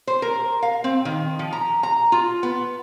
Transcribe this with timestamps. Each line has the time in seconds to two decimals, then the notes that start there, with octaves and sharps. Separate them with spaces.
0.07 C5
0.22 A#4
0.63 F5
0.84 C4
1.05 D#3
1.39 F3
1.53 A#5
1.83 A#5
2.12 F4
2.43 B3